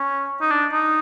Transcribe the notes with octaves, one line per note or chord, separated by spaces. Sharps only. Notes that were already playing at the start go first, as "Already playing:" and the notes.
Already playing: C#4
D#4
D4
D#4